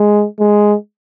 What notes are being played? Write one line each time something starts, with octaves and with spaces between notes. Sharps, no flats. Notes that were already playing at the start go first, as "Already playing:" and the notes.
Already playing: G#3
G#3